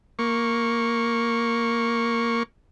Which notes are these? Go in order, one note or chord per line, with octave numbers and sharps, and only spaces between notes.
A#3 C#6